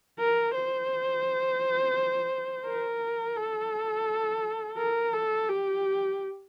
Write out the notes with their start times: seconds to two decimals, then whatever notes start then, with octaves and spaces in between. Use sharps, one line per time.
0.19 A#4
0.55 C5
2.66 A#4
3.37 A4
4.78 A#4
5.13 A4
5.49 G4